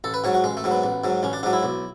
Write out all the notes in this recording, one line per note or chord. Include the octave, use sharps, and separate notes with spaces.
A1 A4
B4
G#2 F#3 C#5
F#4
A1 G#3
A3
G#2 F#3
B3
A1
G#2 F#3
A1 C#4
D4
G#2 F#3 D4
E4
B1